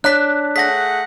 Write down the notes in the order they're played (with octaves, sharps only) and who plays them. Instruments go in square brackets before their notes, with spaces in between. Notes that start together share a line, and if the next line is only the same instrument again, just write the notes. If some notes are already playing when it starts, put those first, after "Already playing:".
[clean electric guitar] D4 [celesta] C#5 [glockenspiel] F#6 B6
[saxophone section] A3 G#4 F#5 [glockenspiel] A#6 B6